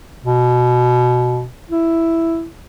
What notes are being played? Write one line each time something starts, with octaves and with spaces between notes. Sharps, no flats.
B2
E4